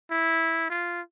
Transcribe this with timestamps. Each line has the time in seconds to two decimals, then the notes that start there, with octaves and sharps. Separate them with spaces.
0.11 E4
0.70 F4